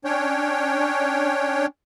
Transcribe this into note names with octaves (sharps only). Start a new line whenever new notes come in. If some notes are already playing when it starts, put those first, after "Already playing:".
C#4 D4 C#5 G5